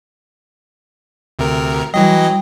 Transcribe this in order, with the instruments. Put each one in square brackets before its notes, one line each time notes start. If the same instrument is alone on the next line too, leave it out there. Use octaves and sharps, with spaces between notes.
[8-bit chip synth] D2 C3 A#4
[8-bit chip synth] E3 F#3 D#5 [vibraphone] G3